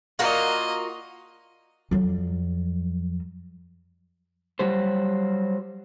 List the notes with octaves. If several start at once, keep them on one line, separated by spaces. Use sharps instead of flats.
A#3 F4 F#4 A#4 D#5
F2 F#3
F#3 G3 C5